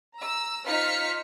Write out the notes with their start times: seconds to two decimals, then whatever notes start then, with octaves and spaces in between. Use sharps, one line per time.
0.17 A#5 E6
0.67 D#4 F4 C5 F6 B6 C#7